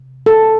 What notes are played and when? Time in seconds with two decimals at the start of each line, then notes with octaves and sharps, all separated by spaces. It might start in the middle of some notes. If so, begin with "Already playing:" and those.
Already playing: C3
0.26 A4